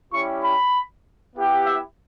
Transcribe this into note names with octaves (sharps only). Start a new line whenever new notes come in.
G3 C#4 E4 G4 C#6
B5
B3 E4 G4
E5